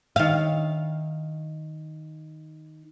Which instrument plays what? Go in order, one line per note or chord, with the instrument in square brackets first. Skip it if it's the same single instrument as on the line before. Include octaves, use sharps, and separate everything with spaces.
[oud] D#3 F5